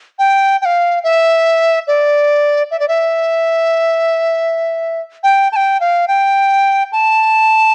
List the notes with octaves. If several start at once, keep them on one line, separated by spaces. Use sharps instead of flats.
G5
G5
F5
E5
D5
E5
D5
E5
G5
A5
G5
F5
G5
A5